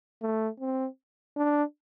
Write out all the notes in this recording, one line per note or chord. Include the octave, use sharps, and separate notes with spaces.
A3
C4
D4